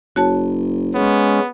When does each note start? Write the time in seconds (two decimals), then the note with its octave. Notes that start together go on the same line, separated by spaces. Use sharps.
0.16 F#1 F#4 C#5 A5
0.95 G#3 B3 C#4